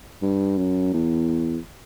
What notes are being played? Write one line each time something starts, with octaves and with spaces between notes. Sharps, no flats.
G2
F#2
E2